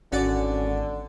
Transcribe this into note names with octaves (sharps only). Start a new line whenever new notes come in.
G#1 D3 C#4 F#4 D5